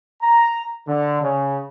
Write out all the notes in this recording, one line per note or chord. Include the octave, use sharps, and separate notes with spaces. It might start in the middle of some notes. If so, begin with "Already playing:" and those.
A#5
D3
C#3